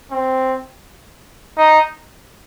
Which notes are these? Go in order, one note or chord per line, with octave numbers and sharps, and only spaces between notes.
C4
D#4